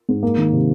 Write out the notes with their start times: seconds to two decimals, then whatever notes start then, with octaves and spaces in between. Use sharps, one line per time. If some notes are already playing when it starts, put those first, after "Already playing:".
0.09 G#2
0.23 A#3
0.38 D#3
0.52 C3